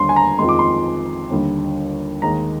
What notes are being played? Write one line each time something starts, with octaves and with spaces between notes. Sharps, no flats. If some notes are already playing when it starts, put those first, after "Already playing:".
Already playing: D#2 D3 G3 C6
G#5
A#5
F2 D#3 G#3 C6
D6
C6
D#2 D3 G3
D#2 D#3 G#3 A#5